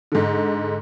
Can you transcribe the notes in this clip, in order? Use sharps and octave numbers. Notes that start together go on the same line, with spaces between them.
G#2 D3